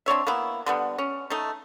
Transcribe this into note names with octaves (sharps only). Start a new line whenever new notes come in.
C4 D4 C#5 E5
A#3 B3 E4
D3 G3 B3
C#4
A3 D#4